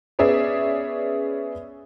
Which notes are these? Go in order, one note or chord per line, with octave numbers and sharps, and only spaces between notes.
B3 C#4 G#4 D5 E5